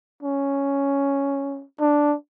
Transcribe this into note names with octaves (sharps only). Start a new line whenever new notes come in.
C#4
D4